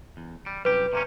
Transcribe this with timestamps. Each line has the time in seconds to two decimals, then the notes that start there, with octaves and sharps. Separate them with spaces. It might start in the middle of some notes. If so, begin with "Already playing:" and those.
0.17 E2
0.46 G3
0.65 C2 F#2 G4 B4
0.93 C3 A#3 C#4